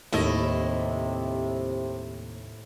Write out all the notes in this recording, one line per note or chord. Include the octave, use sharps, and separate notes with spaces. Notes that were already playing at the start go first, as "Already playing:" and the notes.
D#2 A2 C3 E4 D#5